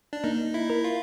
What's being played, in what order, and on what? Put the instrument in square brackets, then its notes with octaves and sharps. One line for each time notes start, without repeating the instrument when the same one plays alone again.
[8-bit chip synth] D4
[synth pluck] A#3 [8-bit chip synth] D#4
[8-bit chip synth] E4
[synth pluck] A#4
[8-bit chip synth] F4